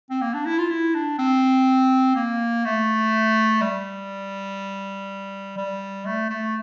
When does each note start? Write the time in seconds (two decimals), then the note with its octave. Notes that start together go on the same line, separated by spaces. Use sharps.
0.10 C4
0.22 A#3
0.34 D4
0.46 E4
0.58 F4
0.70 E4
0.94 D4
1.19 C4
2.16 A#3
2.65 A3
3.62 G3
5.57 G3
6.06 A3
6.30 A3